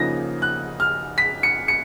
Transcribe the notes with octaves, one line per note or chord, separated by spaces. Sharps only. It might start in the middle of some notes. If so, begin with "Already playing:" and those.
Already playing: C#3 F3 A#3 D#4 A#6
F#6
F6
B6
C#7
C#7